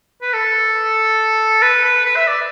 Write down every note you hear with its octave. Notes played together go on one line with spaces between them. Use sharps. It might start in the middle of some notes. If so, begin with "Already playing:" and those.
B4
A4
B4
B4
B4
E5
D5